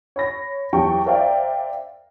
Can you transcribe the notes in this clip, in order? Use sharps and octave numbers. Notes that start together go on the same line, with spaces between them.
C#5 B5 A#6
E2 F#3 G4 G5 A5 C#6
A#4 C5 D5 E5 F5 G5